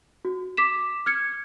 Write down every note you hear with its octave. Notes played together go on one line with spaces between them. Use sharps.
F#4
D6 B6 E7
F6 G#6 C#7